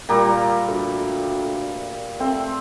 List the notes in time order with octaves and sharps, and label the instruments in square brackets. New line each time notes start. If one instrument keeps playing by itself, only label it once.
[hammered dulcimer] A#2 G3 A#5 [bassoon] A#3
[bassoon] D2
[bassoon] A3 [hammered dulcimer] C4